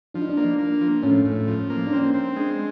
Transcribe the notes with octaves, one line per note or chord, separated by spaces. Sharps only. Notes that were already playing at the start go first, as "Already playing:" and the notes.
F3 D4
D#4
D4
A#3
A#3
F3
A2 C#4
A2
F3
A#3
D4
C4 C#4
C4
G#3 D4